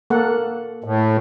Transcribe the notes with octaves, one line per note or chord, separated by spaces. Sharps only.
A#3 A4 F#5
A2